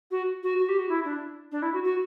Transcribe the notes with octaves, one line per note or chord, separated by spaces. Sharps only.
F#4
F#4
F#4
G4
F#4
E4
D4
D4
E4
F#4
F#4